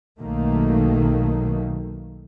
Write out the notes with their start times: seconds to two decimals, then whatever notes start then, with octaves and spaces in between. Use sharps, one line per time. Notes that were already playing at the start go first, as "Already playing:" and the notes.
0.18 B1 D#3 F#3 A3 A#3